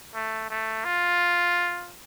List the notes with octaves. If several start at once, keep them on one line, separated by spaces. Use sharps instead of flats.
A3
A3
F4